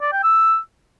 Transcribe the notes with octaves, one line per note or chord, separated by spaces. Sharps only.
D5
G5
E6